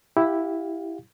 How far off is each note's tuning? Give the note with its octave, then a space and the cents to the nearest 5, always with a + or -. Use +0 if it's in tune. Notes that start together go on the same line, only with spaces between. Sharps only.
E4 +0 G4 +0 F5 +25